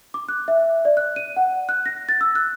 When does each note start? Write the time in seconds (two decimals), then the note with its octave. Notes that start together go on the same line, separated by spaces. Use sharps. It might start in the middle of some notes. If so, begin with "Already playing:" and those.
0.14 D6
0.29 F#6
0.48 E5
0.85 D5
0.97 F#6
1.16 D#7
1.36 F#5
1.69 F#6
1.86 A#6
2.09 A6
2.21 E6
2.35 F#6